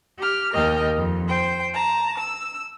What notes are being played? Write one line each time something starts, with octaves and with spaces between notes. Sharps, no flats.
G4 F6
D#2 A#4 D#5 G5 F6
F2
C5 G5
A5 A#5
E6